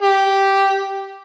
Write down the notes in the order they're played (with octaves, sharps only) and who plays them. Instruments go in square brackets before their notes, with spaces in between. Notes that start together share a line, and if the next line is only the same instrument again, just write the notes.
[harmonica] G4